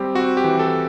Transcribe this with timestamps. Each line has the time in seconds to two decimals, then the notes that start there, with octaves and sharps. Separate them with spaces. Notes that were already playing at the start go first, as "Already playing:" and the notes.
Already playing: G3 C4 G4
0.15 C4 F#4
0.37 G4
0.44 E3
0.59 A4